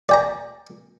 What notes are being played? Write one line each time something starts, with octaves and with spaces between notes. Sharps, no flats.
D5 G5 A#5